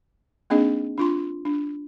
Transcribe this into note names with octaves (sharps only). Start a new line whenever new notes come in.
A#3 C4 D4 D#4 G#4 D#5
D4 F4 C6
D4